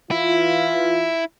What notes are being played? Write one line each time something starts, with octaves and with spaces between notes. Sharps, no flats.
E3 E4 F4